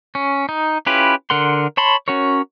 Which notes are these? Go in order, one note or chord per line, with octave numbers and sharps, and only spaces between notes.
C#4
D#4
C#4 E4 F4 G4 B4
D3 A#4 F#5 C6
C#5 A5 B5 C6
C#4 F#4 A#4 C#5